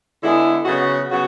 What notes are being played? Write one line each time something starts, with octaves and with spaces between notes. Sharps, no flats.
D3 G#3 B3 E4 G#4
C#3 F#3 B3 F#4
C#3 F#3 B3 F#4